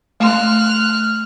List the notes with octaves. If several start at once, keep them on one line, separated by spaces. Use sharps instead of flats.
A3 C6 F6 F#6